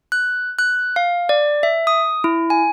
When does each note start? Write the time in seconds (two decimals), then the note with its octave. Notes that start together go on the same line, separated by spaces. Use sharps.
0.12 F#6
0.59 F#6
0.96 F5
1.29 D5
1.63 E5
1.87 D#6
2.24 E4
2.50 G#5